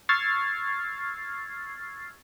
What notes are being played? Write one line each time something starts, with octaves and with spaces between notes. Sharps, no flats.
C#6 E6 F6 G#6 A6 C7